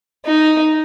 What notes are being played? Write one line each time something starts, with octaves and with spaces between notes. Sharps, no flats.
D#4